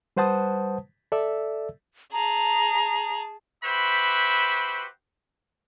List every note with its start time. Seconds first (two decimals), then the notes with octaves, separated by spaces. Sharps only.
0.16 G3 B4 C5 F#5 A5 D#6
1.12 A4 D5 E5 E6
2.13 G#4 A5 A#5
3.64 F#4 G4 B4 C5 E5 B5